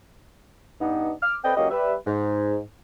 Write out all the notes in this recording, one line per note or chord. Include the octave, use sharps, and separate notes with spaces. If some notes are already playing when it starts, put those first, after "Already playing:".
G2 B3 D4 D#4
D6 F6
C4 A4 B4 D5 D#5 G5
C#2 F#3 A#3 C#4 G4 D#5
G3 B4 E5
G#2